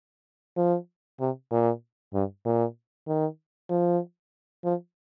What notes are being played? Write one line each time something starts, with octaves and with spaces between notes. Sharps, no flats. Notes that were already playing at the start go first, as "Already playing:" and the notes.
F3
C3
A#2
G2
A#2
D#3
F3
F3